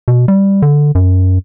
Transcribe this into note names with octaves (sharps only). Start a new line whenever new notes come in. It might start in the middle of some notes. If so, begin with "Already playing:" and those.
B2
G3
D3
F#2